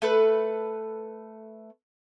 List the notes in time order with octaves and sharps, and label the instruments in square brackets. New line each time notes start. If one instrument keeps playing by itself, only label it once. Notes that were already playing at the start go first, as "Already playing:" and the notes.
[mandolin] A3 A4 B4